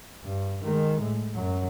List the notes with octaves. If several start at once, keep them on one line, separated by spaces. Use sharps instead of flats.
G2
D#3 G#3
A2
F#2 F#3